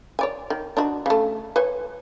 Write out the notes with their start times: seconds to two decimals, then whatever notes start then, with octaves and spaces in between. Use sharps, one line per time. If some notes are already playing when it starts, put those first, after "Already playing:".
0.19 C#5 D5 G#5
0.50 D#3
0.77 D4 D#4 F#4
1.06 C#3 A3
1.56 B4 C#5 G#5